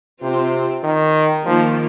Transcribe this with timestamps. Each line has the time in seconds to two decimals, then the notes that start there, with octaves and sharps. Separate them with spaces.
0.22 C3 C4 F4 C5
0.83 D#3
1.45 D#3 F3 A#3 F4